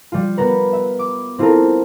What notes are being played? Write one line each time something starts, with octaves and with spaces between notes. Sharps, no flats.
G3 F4
B3 A#4 B4
E5
D6
C4 E4 F4 G4 A4 A#4